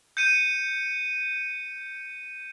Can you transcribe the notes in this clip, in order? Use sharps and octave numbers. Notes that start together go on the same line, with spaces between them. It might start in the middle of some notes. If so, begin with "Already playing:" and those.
G6 C#7 D#7